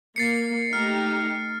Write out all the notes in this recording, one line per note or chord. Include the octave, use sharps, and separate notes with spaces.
A#3 A6 C7 C#7
A3 D#4 G4 F6